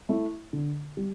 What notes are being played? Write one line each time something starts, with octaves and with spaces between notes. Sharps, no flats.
A3 E4
D3
G3